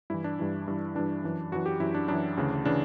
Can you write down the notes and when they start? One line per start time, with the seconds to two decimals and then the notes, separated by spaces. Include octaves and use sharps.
0.10 G2 E3 E4
0.24 D4
0.39 G2 E3
0.68 G2 E3
0.95 G2 E3 D4
1.24 F#2 E3
1.52 F#2 E3 F#4
1.66 G4
1.80 F#2 E3 E4
1.94 D4
2.08 F#2 E3 D4
2.37 D2 C#3 E3
2.65 C#3 E3 D4